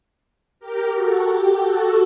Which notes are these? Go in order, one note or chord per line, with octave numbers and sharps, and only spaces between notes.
G4 A#4
F#4 A4
G4
F#4 A4